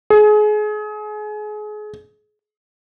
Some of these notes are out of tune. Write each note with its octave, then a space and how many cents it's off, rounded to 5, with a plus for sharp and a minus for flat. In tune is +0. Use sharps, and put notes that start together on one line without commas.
G#4 +30